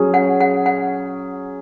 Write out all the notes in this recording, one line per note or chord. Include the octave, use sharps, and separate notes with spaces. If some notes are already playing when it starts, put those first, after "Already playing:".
Already playing: F#3 C#4 G#4
F#5
F#5
F#5